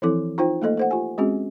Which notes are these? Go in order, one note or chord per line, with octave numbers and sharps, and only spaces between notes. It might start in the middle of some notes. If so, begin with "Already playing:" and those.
E3 F3 C4 E4 A4 D6
D#4 F4 C5 G5
A3 A#3 A4 D#5
A4 C5 F#5
F4 G4 G#5
G#3 C4 C#4 F#4 G#4